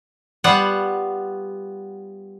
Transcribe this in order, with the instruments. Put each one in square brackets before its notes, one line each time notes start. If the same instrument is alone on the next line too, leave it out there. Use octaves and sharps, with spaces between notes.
[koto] G3 B3 F4 F#5